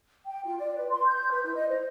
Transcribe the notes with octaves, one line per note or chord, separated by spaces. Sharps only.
G5
F4
D5
B4
C6
G6
B4
E4
D#5
C5